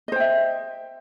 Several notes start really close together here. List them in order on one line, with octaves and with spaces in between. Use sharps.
D#5 C5 G5 E5